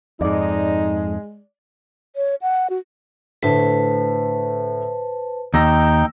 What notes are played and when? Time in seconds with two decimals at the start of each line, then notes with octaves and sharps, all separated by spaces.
0.21 F2 G#2 G#3 D#4 D5
2.16 C#5
2.42 F#5
2.70 F#4
3.43 A2 D3 A3 B4 C5 A5
5.54 D#2 D#4 G5 E6 A#6